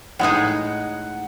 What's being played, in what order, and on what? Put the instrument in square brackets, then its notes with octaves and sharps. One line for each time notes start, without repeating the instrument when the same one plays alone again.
[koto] A2 G#3 D#4 G#4 [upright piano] F#5